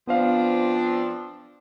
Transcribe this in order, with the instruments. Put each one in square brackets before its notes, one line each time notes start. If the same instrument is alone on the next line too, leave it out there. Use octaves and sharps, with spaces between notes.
[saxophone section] F3 C4 D4 [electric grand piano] B3 C5 F5